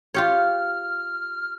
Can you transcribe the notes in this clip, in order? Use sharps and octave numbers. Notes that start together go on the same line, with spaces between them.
F4 G4 C#5 F6